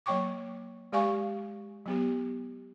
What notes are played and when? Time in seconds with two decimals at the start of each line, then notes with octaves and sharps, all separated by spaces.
0.06 F#3 A#3 C#5 G5 C#6 D6
0.92 G#3 G4 D5 F5 G#5 C#6
1.86 F#3 B3 G4